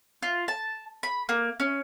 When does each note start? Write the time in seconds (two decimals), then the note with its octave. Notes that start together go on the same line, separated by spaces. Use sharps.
0.22 F4
0.48 A5
1.03 B5
1.29 A#3
1.60 C#4